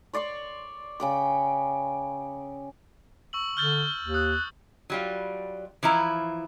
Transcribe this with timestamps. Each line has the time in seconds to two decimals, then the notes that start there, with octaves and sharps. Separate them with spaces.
0.13 C#5 D5 C6 C#6
1.00 C#3 G5 D6
3.33 C#6 E6 F#7
3.57 D3 F6 G6 A6 G7
4.02 D#2
4.14 D#6 F#6
4.90 F#3 G3 F4
5.83 E3 F3 E4 A#5